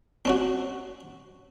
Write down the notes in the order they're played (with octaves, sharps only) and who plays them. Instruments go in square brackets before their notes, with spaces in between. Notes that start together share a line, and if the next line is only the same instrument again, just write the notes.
[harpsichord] C4 C#4 F#4